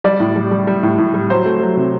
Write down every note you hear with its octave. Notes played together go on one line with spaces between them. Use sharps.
G3 D5
A2
G3
G3
G3
A2
A2
G3
F#3 C5
A3
F#3
C3